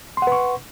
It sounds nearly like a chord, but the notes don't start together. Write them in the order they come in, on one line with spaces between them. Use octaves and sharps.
C6 F#5 B4 C#6